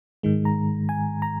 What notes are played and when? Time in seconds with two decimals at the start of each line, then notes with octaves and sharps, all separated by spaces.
0.23 G#2 D#3 G#3
0.45 A#5
0.89 G#5
1.22 A#5